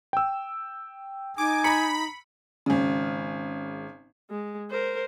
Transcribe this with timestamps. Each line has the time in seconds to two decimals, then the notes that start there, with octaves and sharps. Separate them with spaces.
0.13 G5 E6
1.38 D#4 G#5 D6
1.64 A#5 B5 C#7
2.66 G#1 C#3
4.30 G#3
4.70 A#4 C5